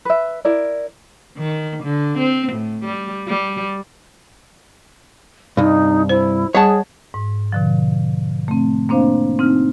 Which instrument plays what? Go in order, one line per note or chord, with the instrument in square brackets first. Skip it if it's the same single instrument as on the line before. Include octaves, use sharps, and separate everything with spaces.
[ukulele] B4 E5
E4 A#4 D5
[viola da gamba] D#3
D3
C4
A2
G3
G3
[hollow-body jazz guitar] C2 G2 [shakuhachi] D#4
[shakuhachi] E4 [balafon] C5
[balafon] G3 [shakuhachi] G#4 [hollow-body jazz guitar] C#5 F#5 A5
[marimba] G#2
B2 D3 F3
A3 C4
A#3 C4 D4 C5 F5
C4 D#4 F6